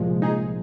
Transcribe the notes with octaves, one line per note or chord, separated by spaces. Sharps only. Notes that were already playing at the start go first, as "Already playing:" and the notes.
Already playing: C2 A#2 F3 G#3
D#4 G#4